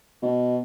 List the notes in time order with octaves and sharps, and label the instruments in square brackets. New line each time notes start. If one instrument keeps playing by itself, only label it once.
[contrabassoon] B2